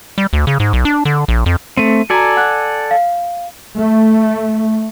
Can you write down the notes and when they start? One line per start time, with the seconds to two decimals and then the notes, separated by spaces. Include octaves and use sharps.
0.18 G3
0.33 D2
0.47 C#3
0.60 G#2
0.73 B1
0.85 D4
1.05 D3
1.28 A#1
1.46 F2
1.77 A3 C4 D#7
2.10 F#4 A4 D5 G#5 A#5
2.37 F#5 F#6
2.91 F5
3.78 A3